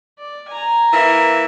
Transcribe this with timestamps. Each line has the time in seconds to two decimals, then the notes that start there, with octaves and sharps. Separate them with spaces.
0.19 D5
0.49 G#5 A#5
0.93 E3 A#3 E5